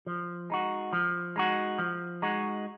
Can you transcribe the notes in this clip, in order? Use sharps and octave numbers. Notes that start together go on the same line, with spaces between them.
F3
G#3 D#4 F#4
F3
G#3 D#4 F#4
F3
G#3 D#4 F#4